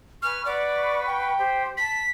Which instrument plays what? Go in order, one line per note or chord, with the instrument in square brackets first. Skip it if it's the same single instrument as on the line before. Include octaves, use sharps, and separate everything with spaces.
[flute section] B4 G#5 C#6 [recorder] F6
[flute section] B4 F#5 C#6 [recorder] D5
[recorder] G5
[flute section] G4 C5
[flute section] A5 [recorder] B6